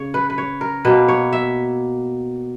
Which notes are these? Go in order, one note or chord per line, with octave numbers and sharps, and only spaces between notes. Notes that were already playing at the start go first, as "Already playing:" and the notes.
Already playing: C#3 C#5
B4
B4
C#5
A#4
B2 A#3 B4
C#5
E5